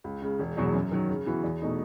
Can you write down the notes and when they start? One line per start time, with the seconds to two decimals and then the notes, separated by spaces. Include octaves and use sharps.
0.04 C#2
0.22 C#3 G#3
0.39 E1
0.57 E2 B2 F#3
0.74 F#2
0.92 D#3 F#3
1.09 C#3
1.26 E3 B3 F#4
1.44 E2
1.62 B2 A3 D#4